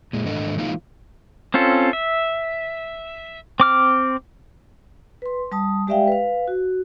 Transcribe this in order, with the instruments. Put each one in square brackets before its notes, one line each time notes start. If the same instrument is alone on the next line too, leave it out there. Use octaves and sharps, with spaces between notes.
[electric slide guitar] A#2 G#3
G#2 D#3 G#3 D4 A4 D#5
E3 G#3 A#3 D#4 F4
[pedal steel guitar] C4 C#4 F4 A4
E5
C4 D6 F6
[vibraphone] B4 C6
G3 A5 D#6
G#3 G4 D5 E5 F5 G5
B4 F5
F#4